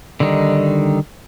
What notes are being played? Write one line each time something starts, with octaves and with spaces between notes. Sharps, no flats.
D3 D#3 G3 D#4